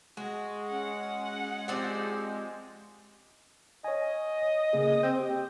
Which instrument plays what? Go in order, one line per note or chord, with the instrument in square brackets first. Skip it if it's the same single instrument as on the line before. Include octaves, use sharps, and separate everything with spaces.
[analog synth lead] G#3 [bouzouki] F#4
[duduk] C#4 [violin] F#5
[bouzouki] F3 C4 D5 [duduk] G4
[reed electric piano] C#5 G#5 [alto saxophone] D#5
[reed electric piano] C#3 A#3 G#4
[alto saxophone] C4 [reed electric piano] G6
[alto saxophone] G4